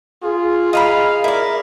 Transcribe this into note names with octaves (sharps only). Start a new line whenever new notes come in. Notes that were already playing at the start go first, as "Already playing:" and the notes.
F4 G#4
D#5 F5 A#5 B5
E4 A#4 D5